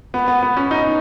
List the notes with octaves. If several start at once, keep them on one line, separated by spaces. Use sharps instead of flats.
B3
B3
B3
C#4
D#4